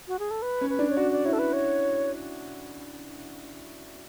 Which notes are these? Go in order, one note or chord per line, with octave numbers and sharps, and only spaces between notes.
F#4
G#4
A4
B4
C#4
B4
D4
C#5
F#4 D5
D5
E4 C#5
A4
B4
C#5